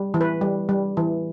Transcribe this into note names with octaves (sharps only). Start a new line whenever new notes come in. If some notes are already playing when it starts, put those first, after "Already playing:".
Already playing: G3
E3
B4
G3
G3
E3